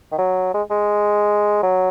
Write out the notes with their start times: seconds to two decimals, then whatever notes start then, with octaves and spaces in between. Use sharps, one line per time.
0.12 D#3
0.18 F#3
0.54 G#3
0.70 G#3
1.63 F#3